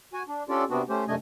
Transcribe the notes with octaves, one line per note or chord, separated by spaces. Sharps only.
F#4 G#5
D4
C#4 D4 F4 G4 A4 D5
C3 B3 C4 D4 F#4
A3 C#4 G4 C5
F#2 C3 A3 D4 D#5 G#5